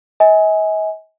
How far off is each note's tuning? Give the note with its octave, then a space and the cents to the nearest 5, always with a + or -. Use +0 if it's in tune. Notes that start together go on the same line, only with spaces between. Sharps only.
D#5 +45 G#5 +0